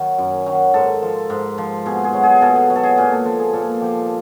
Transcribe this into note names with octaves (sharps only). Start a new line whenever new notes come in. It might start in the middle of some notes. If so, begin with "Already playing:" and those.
Already playing: D#3 F#3
F#2
D#3 F#3
G#2 A4
F3
G#2
F3
B2 G#4
G#4
F#3
G#4
B2 A4
G#4
F#3
A4
G#4
A#2 G#4
A4
F3 A4
G#4
A#2 A4
F3 G4